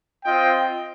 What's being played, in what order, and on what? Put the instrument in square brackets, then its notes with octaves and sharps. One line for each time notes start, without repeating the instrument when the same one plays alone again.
[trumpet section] C4 F4 D#5 G5